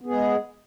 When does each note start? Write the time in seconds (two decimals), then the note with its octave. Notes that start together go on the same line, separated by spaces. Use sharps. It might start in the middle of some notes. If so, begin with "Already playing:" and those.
0.01 B3
0.06 G#4
0.11 G#3